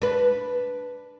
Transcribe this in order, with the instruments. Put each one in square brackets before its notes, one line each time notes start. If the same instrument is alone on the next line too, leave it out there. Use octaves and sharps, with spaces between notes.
[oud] D4 B4